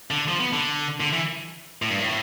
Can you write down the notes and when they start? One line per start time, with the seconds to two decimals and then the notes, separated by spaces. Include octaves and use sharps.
0.11 D3
0.28 F3
0.40 B3
0.53 D3
1.00 D3
1.13 E3
1.82 A2
1.90 G2
2.00 A2